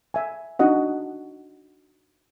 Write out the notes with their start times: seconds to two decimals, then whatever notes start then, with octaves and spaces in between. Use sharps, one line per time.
0.14 E5 G#5
0.59 D4 D#4 F#4 D#5 F#5